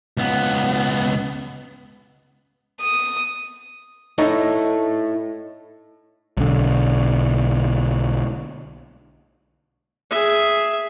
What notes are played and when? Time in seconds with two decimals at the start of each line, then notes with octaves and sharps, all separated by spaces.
0.17 C#2 B3
2.81 D#6
4.18 D#4 E4 A4 C#5
6.37 B1 D3
10.11 G#4 E5